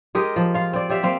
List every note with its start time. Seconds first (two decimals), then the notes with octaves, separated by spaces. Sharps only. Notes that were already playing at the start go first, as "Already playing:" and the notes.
0.15 G#3 G4 A#4 D#5
0.36 F3
0.54 F4 F5
0.73 C4 D5
0.90 G4 D5 E5 F5
1.03 A#3 C4 F5